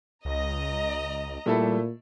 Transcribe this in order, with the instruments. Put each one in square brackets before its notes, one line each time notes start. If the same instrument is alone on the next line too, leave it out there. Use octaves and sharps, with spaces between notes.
[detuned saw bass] C#2 [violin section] D#5 A#5
[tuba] A#2 [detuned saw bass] G3 [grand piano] A3 E4 A4